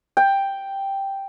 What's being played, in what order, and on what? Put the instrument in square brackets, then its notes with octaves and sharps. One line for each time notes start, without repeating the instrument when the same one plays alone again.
[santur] G5